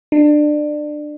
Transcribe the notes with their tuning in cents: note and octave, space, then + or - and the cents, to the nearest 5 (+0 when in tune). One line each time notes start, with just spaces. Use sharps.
D4 +25